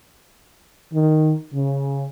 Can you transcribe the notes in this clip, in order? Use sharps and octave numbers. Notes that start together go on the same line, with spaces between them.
D#3
C#3